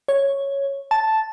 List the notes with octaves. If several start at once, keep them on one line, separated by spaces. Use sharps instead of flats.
C#5
A5